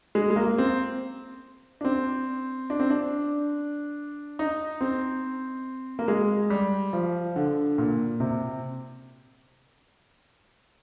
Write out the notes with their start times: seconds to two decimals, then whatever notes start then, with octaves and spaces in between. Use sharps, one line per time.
0.15 G#3
0.30 G#3
0.36 A#3
0.58 C4
1.81 D4
1.85 C4
2.70 D4
2.80 C4
2.90 D4
4.39 D#4
4.81 C4
5.99 A#3
6.08 G#3
6.50 G3
6.93 F3
7.36 D3
7.78 A#2
8.20 C3